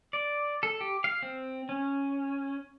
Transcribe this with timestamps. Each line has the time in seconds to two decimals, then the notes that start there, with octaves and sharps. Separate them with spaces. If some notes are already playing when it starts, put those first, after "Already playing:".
0.13 D5
0.63 A4
0.81 G4
1.04 F5
1.22 C4
1.69 C#4